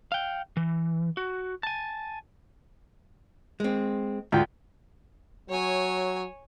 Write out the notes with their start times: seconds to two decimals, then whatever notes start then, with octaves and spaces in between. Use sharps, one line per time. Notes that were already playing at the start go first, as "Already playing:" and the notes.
0.12 F5 G5
0.57 E3
1.17 F#4
1.63 G#5 A5
3.60 G#3 C4
4.32 D2 G#2 F4 G5
5.50 F#3 C#5 G#5